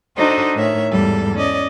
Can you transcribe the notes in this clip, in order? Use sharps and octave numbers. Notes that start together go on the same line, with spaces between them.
D4 D#4 F#4 A4 C5 D#5
A2 D#3 C#5 E5
E2 G#2 G3 A4
C#4 D5 D#5